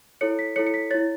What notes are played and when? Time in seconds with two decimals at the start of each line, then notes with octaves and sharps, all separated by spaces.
0.21 E4 A4 C#5 C#7
0.39 B6
0.56 E4 A4 C#5 C#7
0.66 C#7
0.74 B6
0.91 E4 C#5 A6